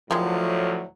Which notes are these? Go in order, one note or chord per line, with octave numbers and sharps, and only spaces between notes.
D2 A2 D#3 F3 F#3 G#3